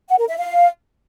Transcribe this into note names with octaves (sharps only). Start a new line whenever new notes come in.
F#5
A#4
E5
F5